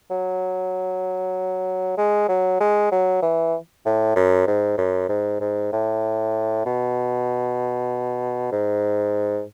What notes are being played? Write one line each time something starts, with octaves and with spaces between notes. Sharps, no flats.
F#3
G#3
F#3
G#3
F#3
E3
A2
F#2
G#2
F#2
G#2
G#2
A2
B2
G#2